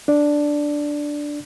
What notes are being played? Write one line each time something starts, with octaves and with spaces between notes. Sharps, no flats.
D4 D5